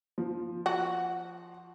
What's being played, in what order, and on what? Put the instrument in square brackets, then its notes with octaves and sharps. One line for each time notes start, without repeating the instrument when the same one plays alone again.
[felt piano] F3
[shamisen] F#4